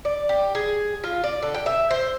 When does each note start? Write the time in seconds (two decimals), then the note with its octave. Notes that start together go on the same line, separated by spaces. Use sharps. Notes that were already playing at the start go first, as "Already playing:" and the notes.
0.05 D5
0.29 G4
0.55 G#4
1.04 F4
1.24 D5
1.42 D3
1.54 G5
1.66 E5
1.91 C5